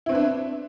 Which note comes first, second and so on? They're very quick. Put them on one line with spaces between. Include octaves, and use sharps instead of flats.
E4 C4 B4 D4